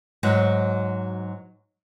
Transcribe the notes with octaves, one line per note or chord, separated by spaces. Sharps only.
G#2 F#3 F#4